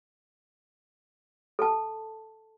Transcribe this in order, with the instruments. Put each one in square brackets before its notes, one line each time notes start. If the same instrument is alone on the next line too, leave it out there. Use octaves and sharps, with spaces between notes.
[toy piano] A4 A5